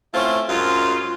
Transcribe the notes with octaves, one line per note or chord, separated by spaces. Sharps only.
A3 C4 C#4 E4 F4
F#2 G#3 F4